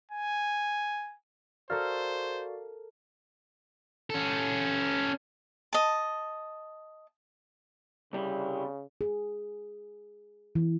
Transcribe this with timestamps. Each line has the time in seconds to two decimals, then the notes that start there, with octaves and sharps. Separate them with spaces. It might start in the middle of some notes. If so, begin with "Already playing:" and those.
0.11 G#5
1.70 F#4 A4 A#4 C5 D5 F5 F6
4.10 C#4 A4
5.73 D#5 A5
8.13 C2 C#3 G3
9.01 G#4
10.55 E3